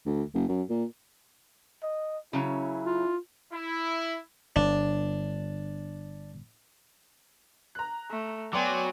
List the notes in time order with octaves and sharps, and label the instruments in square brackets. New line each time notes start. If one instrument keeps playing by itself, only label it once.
[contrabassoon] D2
F#1
F#2
A#2
[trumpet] D#5
[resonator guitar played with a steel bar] C#3 F#3 C#4 [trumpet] E4
[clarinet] F4
[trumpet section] E4
[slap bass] G1 [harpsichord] D4
[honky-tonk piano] A#5 F#6
[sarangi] A3
[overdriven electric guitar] F#3 [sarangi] B3 [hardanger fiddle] D5 G#5 [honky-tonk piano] G5 C6 D6